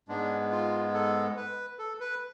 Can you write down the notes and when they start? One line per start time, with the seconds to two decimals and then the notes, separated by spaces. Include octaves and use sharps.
0.08 G#2 G#3 B3 D4
0.51 F4
0.94 A4
1.37 B4
1.79 A4
2.00 B4